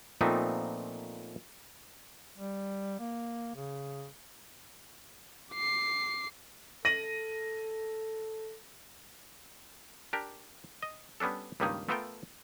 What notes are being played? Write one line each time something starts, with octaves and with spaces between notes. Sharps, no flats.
A#2 F3 A3 B3 C4 D#4
G3
A#3
C#3
D6 C7
A4 A#6 D#7 F#7
D4 G4 A#4
D#5
G3 B3 C#4 D4 A4
C#2 G2 D#3 G3 A#3 D#4
A3 B3 F4 A4 A#4 G5